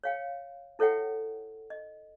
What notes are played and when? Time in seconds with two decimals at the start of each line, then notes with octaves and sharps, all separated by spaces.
0.04 C#5 F5 G5
0.79 E4 A4 C#5 E5 F#5 G5
1.70 D#5